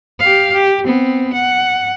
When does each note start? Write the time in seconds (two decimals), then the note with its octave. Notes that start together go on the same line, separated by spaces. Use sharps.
0.19 G4 F5
0.53 G4
0.84 B3 C4
1.33 F#5